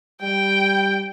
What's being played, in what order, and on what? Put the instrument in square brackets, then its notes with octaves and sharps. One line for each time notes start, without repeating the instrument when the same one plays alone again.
[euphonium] G3 [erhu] G5